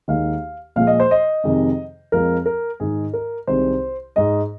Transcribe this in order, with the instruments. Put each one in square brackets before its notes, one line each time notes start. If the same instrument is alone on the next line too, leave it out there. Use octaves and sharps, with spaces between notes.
[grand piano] D#2 D#3 G#3 F5
A#2 F3 G#3 F5
D#5
C5
D#5
F2 C3 D#3 G#3
F2 F3 G#3 A#4
A#4
G#2 D#3 G#3 G#4
A#4
C2 C3 D#3 G#3 C5
G#2 G#3 D#5